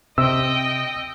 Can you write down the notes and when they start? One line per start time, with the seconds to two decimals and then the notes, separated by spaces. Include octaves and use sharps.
0.18 C3 D#5 G5 E6